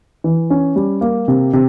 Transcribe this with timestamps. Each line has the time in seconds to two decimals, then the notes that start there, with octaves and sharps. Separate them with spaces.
0.24 E3
0.50 C#4
0.76 G3
1.01 A#3
1.28 C3
1.53 C3